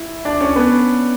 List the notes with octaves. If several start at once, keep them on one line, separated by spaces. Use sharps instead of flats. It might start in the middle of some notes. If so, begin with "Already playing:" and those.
Already playing: E4
D4 D5
C#4 C#5
B3 B4